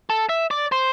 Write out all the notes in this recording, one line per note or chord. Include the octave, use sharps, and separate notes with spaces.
A4
E5
D5
C5